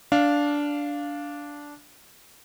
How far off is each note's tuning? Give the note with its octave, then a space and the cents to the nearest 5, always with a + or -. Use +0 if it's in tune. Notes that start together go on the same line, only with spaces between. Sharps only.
D4 -10 F5 +0